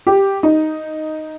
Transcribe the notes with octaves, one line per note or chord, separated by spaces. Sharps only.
G4
D#4